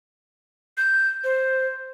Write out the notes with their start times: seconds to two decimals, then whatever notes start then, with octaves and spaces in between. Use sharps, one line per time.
0.78 G6
1.24 C5